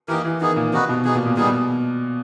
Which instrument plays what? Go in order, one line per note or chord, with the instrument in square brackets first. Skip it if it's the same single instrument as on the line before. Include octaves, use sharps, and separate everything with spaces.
[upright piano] E3 [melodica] A#3 D#4 G4 A#4
[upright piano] E3
[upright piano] D#3 [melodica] B3 D#4 G#4
[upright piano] A#2
[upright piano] C3 [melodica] D#4 F#4 B4
[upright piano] B2
[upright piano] B2 [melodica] B3 D#4 G#4
[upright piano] A#2
A#2
[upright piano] A#2 [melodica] G3 B3 D#4 G#4
[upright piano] B2